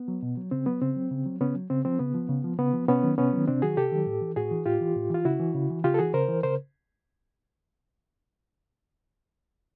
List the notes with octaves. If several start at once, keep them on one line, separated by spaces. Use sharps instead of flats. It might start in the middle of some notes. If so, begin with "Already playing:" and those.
Already playing: B3
F#3
B2
F#3
C#3 C4
F#3 B3
C#3 C4
F#3
C#3
F#3
C#3 B3 C#4
F#3
C#3 C4
F3 C4
C#3 B3
F3
C#3
F3
C#3 B3
F3
C3 B3 C#4
D#3 F#3
C3 B3 C#4
D#3 F#3
C3 C4 D4
D#3 F#3 F#4 G#4
C3 G4 A4
D#3 F#3
A2
E3
A2 F#4 G#4
E3
A2 F4 G4
E3
A2
E3 F4
C#3 E4 F#4
E3
C#3
E3
C#3 F4 G4
A4
E3 F#4 G#4
C#3 A#4 C5
E3
C#3 A#4 C5